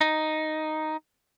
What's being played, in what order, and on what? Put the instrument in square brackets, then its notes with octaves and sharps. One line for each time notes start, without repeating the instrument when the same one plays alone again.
[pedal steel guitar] D#4